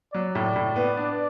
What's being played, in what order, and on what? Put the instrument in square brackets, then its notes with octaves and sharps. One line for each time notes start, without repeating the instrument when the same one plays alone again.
[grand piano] F#3 [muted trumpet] D5
[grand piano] A2
A2
B3
D4